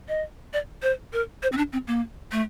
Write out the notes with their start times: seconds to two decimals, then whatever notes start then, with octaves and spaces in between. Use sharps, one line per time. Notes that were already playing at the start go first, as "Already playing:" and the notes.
0.08 D#5
0.53 D5
0.83 C5
1.13 A#4
1.43 C5
1.52 C4
1.57 D4
1.73 C4
1.87 A#3
2.32 A3